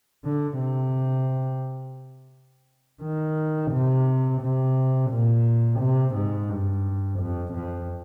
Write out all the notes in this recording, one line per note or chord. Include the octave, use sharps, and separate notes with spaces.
D3
C3
D#3
C3
C3
A#2
C3
G#2
G2
F2
F2